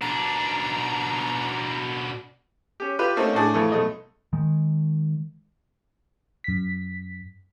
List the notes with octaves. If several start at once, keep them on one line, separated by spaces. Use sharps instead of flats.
B2 D4 A#5
C#4 G4
F4 G4 B4
A3 A#3 C4 C#4 D#4
A2 A3 D4 G#4
F2 E3 A3
B1 A3 D#5
D#3 G#3
F#2 B6